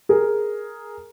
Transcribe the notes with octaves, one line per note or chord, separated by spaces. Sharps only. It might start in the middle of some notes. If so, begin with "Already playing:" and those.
G#4 A#4